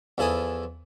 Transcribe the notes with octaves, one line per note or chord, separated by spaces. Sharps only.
E2 F3 E4 A4 G#5 D#6